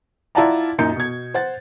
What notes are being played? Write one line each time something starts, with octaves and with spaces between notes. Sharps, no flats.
E4 F4 D5 F#5 A5 A#5
F#2 A#2 D#4 G6 C#7
B2 G#6
C5 F#5 A6